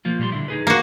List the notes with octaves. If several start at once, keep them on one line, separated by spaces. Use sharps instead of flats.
F3 A#3 F4
A#2 G3 C6
D3 E4
D#4 G#4 B4
A#3 F#4